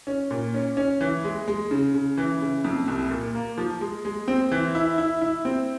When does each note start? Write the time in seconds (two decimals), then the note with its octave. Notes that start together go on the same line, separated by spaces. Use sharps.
0.07 C#4
0.31 A#2
0.54 C#4
0.77 C#4
1.01 E3
1.24 G#3
1.48 G#3
1.71 C#3
1.94 C#3
2.18 E3
2.41 C#3
2.64 F2
2.88 C2
3.11 A#2
3.35 A#3
3.58 F3
3.81 G#3
4.05 G#3
4.28 C4
4.52 E3
4.75 E4
4.98 E4
5.21 E4
5.45 C4